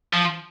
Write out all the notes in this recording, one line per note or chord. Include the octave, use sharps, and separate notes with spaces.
F3